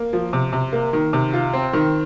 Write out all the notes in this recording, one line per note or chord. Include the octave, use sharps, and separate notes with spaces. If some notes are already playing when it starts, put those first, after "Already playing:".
Already playing: A#3
F3
C3
C3
A#3
D#3
C3
F4
C4
D#3